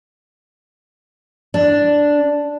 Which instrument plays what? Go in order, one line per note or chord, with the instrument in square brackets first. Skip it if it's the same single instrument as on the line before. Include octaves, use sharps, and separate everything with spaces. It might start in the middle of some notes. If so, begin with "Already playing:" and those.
[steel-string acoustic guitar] D4